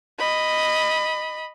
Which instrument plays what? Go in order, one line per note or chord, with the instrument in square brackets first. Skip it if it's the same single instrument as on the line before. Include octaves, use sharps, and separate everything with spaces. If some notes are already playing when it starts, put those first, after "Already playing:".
[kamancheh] D#5 B5